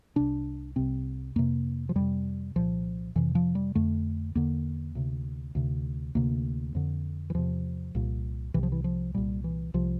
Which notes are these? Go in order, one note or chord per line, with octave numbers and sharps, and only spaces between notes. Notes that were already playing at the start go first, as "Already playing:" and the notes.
C2 C3 D4
C2 C3 C4
F2 C3 A#3
F3
F2 C3 G3
C2 A#2 F3
F2 C3 E3
F3
G3
F2 D3 A3
E2 D3 A#3
D2 C3
D2 C3
D2 C3 A#3
F2 D3
E3
E2 C3 F3
C2 A#2
C2 C3 E3
F3
E3
F3
C2 A#2 G3
E3
C2 C3 F3